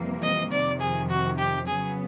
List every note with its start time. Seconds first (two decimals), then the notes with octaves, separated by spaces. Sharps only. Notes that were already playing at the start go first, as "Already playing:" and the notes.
Already playing: F2 C3 E3 G3 A#3
0.22 D#5
0.51 F2 C3 D#3 D5
0.81 G#4
1.10 F#4
1.38 G4
1.67 C#3 F#3 B3 G#4